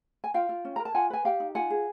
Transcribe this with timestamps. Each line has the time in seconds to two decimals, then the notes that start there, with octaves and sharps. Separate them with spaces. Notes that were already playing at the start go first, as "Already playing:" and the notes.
0.24 G#5
0.34 F4 F5 G5
0.49 F4
0.65 C#4
0.76 A#4 A#5
0.85 A5
0.95 F4 F#5 G#5
1.10 B4 G#5
1.25 G4 F5 G5
1.40 D#4
1.55 F4 F#5 G#5
1.70 G#4